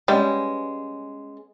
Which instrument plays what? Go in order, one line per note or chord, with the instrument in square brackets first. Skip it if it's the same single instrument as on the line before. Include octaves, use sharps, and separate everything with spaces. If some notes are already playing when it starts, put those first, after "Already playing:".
[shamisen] G3 [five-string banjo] G#3 [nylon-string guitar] B3 C#4